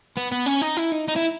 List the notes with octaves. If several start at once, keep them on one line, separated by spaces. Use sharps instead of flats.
B3
B3
C#4
D#4
E4
D#4
D#4
E4